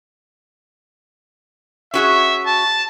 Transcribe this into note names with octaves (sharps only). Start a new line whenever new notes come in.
C#4 F#4 G#4 E5
A5